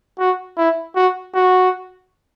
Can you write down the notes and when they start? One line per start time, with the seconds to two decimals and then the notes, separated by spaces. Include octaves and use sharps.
0.19 F#4
0.57 E4
0.96 F#4
1.35 F#4